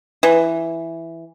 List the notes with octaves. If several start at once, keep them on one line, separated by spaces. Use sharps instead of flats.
E3